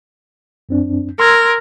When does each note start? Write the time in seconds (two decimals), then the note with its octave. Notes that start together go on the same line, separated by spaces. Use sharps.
0.69 F#2 C4 D4
1.20 A#4 C6 E6 G#6